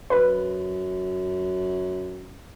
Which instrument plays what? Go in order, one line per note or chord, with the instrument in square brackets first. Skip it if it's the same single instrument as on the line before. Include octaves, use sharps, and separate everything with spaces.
[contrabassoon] F#2 [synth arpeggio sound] B4